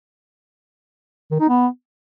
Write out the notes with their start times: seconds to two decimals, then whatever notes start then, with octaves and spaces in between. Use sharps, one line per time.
1.31 D#3
1.40 D#4
1.49 B3